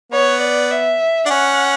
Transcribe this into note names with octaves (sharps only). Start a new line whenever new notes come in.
B3 C#5
D5
E5
D4
C#4 F#5